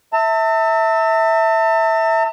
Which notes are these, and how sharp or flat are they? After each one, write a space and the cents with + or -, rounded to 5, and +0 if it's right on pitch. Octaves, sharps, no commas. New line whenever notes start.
E5 -15 A5 +40